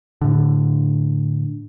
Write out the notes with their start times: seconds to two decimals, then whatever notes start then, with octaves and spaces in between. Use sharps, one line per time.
0.21 A2 D3